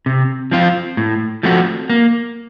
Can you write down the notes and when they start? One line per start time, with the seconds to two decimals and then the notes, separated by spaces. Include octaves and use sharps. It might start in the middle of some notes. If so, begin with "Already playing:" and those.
0.06 C3
0.51 F3 C4 F4
0.97 A2
1.43 F3 A3 C4 F#4
1.90 A#3